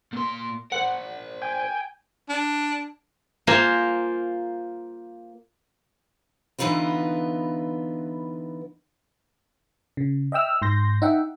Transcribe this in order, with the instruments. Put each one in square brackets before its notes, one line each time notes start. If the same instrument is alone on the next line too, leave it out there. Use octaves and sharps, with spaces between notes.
[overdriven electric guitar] A#2 C6
[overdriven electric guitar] A#4 C5 [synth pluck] F#5
[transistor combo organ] G5 G#5
[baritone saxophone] D4
[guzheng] A#3 F4 C5 G#5 A#5
[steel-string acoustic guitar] D3 E3 B3 D#4 F4 B4
[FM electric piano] C#3
D#5 E5 G5 E6 F6
G#2 C6 G6 A#6
D#4 E5 F#5 G5